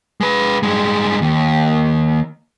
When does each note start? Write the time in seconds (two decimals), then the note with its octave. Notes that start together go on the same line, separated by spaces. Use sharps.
0.21 G#3 B4
0.63 G2 G#3
1.22 D#2